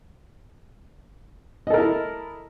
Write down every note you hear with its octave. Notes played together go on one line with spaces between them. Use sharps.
E4 A4 A#4 D#5